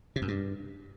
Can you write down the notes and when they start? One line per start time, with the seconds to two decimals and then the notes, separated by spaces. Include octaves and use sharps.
0.16 C3
0.22 F#2
0.28 G2